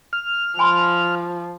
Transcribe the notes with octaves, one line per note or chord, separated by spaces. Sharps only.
F6
F3 G#5 B5 C6